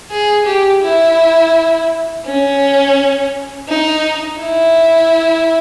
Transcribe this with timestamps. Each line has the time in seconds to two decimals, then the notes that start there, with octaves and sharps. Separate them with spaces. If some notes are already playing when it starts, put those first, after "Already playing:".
0.11 G#4
0.46 G4
0.83 E4
2.25 C#4
3.68 D#4
4.40 E4